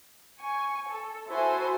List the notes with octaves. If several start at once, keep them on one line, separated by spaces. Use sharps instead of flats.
G#5 C#6
A4
E4 F#4 A4 C5 G#5